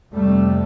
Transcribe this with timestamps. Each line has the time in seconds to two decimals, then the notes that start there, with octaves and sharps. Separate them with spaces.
0.14 F2 C3 G3 A3